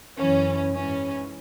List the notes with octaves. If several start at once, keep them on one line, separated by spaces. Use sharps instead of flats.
F#2 E3 C#4
G#2 E3 C#4